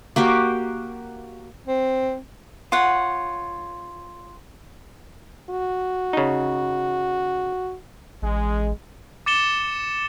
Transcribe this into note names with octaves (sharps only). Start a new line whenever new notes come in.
A#3 F#4 G4 G5
C4
F4 C#5 F#5
F#4
C#3 D#4
A1 G#3
D6 A6 C#7 E7 G7